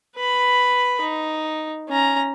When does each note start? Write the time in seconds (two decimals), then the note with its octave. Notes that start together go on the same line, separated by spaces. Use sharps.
0.16 B4 B5
1.01 D#4
1.89 C#4 A#5